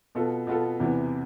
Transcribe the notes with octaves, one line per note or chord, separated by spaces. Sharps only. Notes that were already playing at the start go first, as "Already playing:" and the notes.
B2 B3 F4 A4
B2 B3 F4 A4
E2 C3 E3 B3